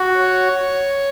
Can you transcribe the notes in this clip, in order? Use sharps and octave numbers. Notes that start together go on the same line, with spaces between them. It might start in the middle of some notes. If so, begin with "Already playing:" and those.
Already playing: F#4
C#5